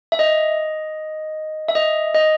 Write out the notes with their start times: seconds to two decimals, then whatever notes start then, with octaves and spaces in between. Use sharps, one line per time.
0.12 E5
0.19 D#5
1.69 E5
1.75 D#5
2.15 D#5